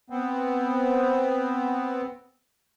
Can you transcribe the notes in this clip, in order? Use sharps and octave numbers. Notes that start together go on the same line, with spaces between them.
B3 C4